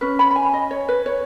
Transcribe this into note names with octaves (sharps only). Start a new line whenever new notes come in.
C#4 B4
B5
B5
G#5
D#5
C#5
B4
C#5